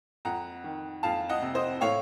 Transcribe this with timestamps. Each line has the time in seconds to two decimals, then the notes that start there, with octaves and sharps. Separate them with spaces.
0.25 F2 F#5 A#5
0.64 D#3
1.03 F2 F5 A5
1.29 D#5 F#5
1.42 C3
1.55 C5 D#5
1.81 A2 C#5 F5